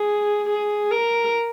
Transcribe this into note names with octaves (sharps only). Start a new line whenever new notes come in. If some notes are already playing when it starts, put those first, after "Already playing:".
Already playing: G#4
G#4
A#4